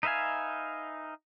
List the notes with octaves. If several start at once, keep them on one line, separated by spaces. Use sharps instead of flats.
D#4 B4 E5 F5 G#5